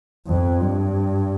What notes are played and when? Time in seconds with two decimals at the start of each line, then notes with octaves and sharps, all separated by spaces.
0.27 F2
0.61 G2